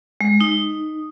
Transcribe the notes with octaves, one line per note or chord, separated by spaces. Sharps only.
G#3
D#4